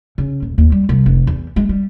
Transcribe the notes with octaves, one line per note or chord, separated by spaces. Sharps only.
C#3
D#1
D#2
G3
C2
F1
E2
G#3
G3